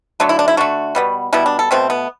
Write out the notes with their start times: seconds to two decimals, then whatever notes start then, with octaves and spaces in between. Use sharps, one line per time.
0.20 D3 F#3 A3
0.29 E4
0.39 D4
0.48 E4
0.57 D3 A3 F#4
0.95 B2 G3 B3
1.33 B2 G3 B3 E4
1.46 D4
1.59 A4
1.71 B2 A3 C4
1.90 B3